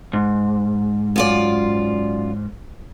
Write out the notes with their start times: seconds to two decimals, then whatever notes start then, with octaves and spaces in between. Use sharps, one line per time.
0.13 G#2
1.16 F#2 F4 D5